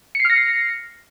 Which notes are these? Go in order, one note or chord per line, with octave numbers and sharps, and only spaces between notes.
F6 A#6 C7 C#7